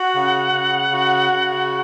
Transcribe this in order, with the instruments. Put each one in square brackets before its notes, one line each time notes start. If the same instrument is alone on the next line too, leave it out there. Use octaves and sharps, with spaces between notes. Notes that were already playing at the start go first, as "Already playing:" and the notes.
Already playing: [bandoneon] F#4 [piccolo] F#5
[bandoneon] C#3
C#3
F#4
C#3